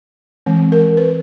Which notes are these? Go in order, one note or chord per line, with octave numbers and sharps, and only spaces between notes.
E3 G#3 C4
A#4
B4